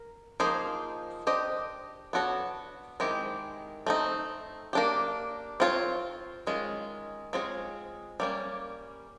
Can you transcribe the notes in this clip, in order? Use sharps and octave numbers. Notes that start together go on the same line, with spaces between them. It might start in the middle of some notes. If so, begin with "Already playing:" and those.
Already playing: A#4
F3 A#3 D#4 G#4 C5
D4 G4 C5 D#5
B3 D4 F#4 A4 C#5
D#3 G#3 C4 E4 G4
A3 C4 D#4
A#3 D4 G4
C4 F4 A4 C#5
D#3 G#3 C#4 F4
G#3 C4 F4 G#4 C#5
G3 A#3 C#4